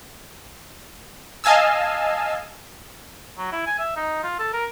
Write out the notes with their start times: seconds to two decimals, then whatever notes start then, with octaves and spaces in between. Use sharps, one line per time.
1.44 D#5 F5 G#5 A5 E6
3.38 F#3
3.52 E4
3.66 G#5
3.79 E5
3.96 D#4
4.23 F4
4.39 A4
4.53 A#4